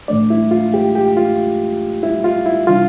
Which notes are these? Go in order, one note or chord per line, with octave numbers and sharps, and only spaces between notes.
A2 E3 A3 D4 D5
E4
F4
G4
G4
F4
E4
F4
E4
C3 E3 G3 D4 F4